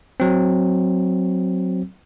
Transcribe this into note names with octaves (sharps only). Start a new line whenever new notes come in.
F#3 C4